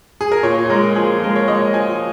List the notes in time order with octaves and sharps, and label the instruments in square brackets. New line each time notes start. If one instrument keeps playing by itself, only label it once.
[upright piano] G#4
A#4
A#2 C#5
G#3 A#4
F3 G#4
G#3 A#4
C#5
G#3 D#5
F3 G#5